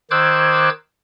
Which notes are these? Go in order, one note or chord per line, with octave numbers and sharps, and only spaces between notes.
D#3 C5 D6 E6 F#6 G#6